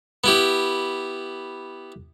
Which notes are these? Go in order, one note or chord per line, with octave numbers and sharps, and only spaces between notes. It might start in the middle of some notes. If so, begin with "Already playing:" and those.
B3 E4 G4